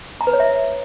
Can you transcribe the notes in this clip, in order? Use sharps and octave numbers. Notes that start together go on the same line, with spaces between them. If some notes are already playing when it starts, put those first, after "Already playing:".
A#5
B4
C#5
E5